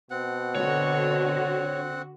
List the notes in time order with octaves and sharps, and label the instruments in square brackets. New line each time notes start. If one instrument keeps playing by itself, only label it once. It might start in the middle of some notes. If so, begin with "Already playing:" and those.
[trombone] B2 [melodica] C4 F#5
[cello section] D3 F#4 [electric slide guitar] C#5